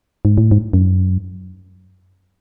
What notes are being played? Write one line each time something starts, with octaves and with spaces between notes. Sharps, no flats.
G#2
A2
G#2
F#2